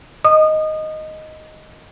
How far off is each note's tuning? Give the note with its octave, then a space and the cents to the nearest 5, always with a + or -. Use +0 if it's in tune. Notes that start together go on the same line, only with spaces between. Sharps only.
D#5 +0 D#6 -25